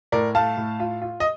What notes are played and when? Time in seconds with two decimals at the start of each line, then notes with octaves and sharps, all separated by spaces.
0.12 A2 A#4 D5
0.35 A3 F5 A5
0.57 A2
0.80 F4
1.02 F4
1.20 D#5